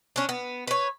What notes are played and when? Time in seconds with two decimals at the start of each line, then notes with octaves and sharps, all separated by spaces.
0.16 C#4 D4
0.29 B3
0.67 B4 C#5